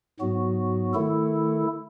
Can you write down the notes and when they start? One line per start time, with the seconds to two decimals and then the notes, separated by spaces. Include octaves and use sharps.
0.20 G#2 F#3 B3 F#4
0.94 D#3 A3 E4 A4